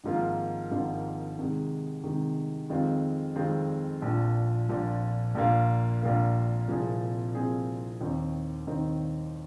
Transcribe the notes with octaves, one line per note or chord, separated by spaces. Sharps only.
G#1 G#2 F3 A#3 F4
G#1 G#2 F3 A#3 F4
C3 D#3 G#3
C3 D#3 G#3
F2 D#3 G#3 C4 F4
F2 D#3 G#3 C4 F4
A#1 A#2 F3
A#1 A#2 F3
A#1 A#2 A#3 F4
A#1 A#2 A#3 F4
C2 A#2 F3 C4 G#4
C2 A#2 F3 C4 G#4
D#2 D#3 C4 D#4
D#2 D#3 C4 D#4